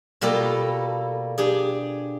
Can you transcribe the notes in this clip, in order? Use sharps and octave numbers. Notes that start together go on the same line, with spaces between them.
B2 G3 A#3 F4 G4 A4
D4 G4 G#4